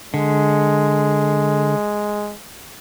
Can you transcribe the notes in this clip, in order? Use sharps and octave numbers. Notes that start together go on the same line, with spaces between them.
D3 G#3